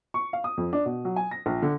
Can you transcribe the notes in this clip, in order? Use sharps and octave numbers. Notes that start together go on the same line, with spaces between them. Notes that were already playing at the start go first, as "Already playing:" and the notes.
C#6
F5
D#6
F2
D4
B2
F#3
G#5
A#6
A#1
D3